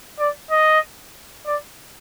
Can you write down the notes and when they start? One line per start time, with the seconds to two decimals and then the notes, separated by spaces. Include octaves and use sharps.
0.19 D5
0.51 D#5
1.46 D5